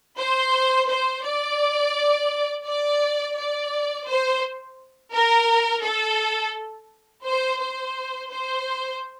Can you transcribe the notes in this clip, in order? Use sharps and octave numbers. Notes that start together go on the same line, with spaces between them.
C5
C5
D5
D5
D5
C5
A#4
A4
C5
C5
C5